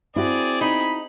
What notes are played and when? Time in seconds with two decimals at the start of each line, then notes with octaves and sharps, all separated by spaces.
0.16 C4 E4 F#4 G#4 D5
0.61 D#4 B5